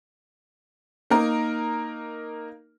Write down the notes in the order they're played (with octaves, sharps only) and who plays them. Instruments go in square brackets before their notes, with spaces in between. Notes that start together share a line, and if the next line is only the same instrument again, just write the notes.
[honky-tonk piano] A#3 D#4 A#4